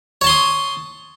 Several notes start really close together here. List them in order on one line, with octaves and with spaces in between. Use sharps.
C#5 A5 C6 D#6